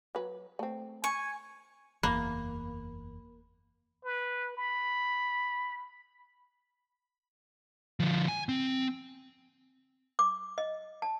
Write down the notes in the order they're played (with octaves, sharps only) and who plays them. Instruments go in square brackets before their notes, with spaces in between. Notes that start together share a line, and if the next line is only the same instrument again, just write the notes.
[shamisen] F#3 B4
A3 C4
[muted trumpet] G#5 [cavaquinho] C#6
[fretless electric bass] F#1 E2 [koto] A#3 [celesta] B5
[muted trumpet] B4
B5
[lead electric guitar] D3 F3
G#5
C4
[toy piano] D6
D#5
A5